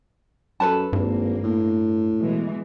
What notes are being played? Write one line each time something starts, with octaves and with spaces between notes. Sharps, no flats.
F#2 A4 B4 A5
G#1 G2 A#3
A2
B2 E3 G#3